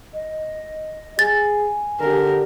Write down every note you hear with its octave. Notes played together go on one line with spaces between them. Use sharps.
D#5
G#4 G#5 A6
D3 G4 A#4